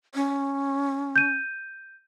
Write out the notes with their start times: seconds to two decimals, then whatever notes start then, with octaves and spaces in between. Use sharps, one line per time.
0.15 C#4
1.16 G6 D#7